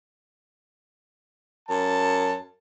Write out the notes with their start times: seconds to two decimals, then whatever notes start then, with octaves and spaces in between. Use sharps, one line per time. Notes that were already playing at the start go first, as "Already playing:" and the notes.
1.69 F#2 A5